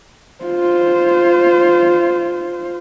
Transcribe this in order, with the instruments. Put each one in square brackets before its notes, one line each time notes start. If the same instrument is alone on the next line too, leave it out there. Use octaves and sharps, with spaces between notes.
[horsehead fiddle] F4 C5